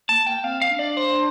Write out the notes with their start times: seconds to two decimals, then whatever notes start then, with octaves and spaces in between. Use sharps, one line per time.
0.09 A#3 A5
0.26 A#3 G5
0.44 C4 F5
0.62 F5
0.70 D4
0.79 D5
0.97 C5